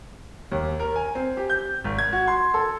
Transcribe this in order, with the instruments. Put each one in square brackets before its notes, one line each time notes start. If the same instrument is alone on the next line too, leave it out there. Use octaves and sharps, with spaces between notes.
[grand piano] D#2
A#4
G#5
C4
G4
G6
G#1
G#6
F#4
C6
A4